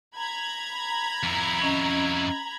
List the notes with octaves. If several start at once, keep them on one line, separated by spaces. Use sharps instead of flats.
A#5 B5 G#6
F2 E4
C#4 D#5